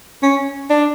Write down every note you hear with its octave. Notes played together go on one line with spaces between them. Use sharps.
C#4
D4